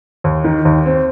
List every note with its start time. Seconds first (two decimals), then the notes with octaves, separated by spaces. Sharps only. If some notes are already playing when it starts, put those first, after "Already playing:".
0.24 D#2
0.44 D#3
0.65 D#2
0.86 C4